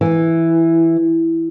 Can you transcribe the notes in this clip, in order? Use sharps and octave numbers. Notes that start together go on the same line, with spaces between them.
E3